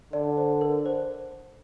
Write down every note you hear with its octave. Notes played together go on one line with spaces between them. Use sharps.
D3 D5
C5
A#4
C5